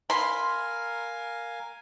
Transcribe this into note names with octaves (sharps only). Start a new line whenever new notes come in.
A#4 F5 G#5 B5 C6